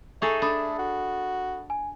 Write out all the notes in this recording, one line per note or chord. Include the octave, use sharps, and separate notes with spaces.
A3 D#4 G#4 A4 C#6
D4 A4 B5 D#6
F#4
G#5